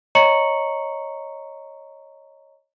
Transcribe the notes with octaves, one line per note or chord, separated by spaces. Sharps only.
C#5 D#5 A#5 C#6 C#7 F#7